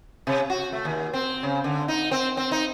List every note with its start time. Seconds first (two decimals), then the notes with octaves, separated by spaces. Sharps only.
0.27 C3
0.50 F#4
0.72 A3
0.85 D#2
1.13 C4
1.43 C#3
1.64 D3
1.88 D#4
2.11 C4
2.37 C4
2.51 D#4